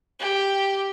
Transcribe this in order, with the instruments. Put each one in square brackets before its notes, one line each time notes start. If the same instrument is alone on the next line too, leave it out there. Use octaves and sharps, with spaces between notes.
[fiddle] G4